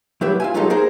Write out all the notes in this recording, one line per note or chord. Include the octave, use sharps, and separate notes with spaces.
F#3 E4 G4 B4 E5
F4 E5 G#5
F#3 G#3 D#4 F4 G4 A4
D#4 G#4 A#4 C5